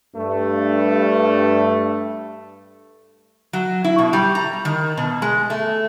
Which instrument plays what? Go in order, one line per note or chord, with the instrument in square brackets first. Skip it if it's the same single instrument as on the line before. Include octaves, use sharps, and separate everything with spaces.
[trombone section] G2 A3
[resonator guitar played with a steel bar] F#3
E4
B2
G3
A#5
D#3
B2
G#3
A3